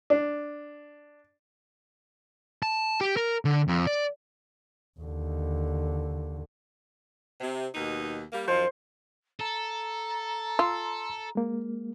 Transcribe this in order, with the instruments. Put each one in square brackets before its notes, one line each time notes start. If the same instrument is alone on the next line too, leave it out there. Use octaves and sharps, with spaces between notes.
[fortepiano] D4
[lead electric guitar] A5
G4
A#4
D3
F2
D5
[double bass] D#2 D3
[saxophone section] C3
D#2 B2 D#4
G3 A#3
[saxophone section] F#2 D#3 F3 [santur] C5
[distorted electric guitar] A4 [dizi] A#5
[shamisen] F4 [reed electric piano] C6 E6
[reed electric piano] G#3 A#3